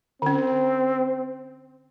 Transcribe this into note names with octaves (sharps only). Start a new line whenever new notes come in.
D3 C4 C#4